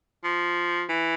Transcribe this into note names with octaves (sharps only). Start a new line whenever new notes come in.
F3
E3